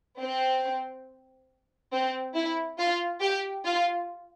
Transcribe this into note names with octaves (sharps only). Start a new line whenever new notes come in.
C4
C4
E4
F4
G4
F4